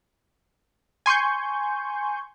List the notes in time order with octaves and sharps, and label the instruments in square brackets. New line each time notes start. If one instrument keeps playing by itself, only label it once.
[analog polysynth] G#5 C6 C#6 G6